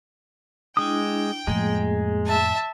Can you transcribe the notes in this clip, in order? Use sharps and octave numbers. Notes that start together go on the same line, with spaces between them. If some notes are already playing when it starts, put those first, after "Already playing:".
G#3 D4 E4 G5 D#6
F2 A2 G#3 A#3 G#4
E5 A5